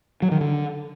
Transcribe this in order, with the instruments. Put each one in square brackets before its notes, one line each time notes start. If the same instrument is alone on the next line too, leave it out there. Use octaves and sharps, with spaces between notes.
[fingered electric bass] F#3
D#3
D3